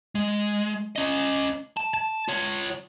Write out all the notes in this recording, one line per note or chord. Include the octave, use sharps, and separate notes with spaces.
G#3
C#4 D#5
A5
A5
F4 C#5